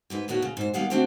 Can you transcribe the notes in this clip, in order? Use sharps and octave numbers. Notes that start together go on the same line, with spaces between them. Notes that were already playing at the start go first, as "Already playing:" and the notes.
G#2 G#3 B4
D#2 A2 B3 F#4 C#5
C#3
G#2 C5
D#3 G3 B3 F5 F#5 G#5
D3 A3 C4 D4 F#4 A4